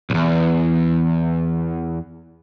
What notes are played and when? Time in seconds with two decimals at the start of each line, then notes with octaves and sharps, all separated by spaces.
0.10 B1 E2